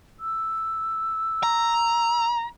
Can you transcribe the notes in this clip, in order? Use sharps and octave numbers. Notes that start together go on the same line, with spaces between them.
E6
A#5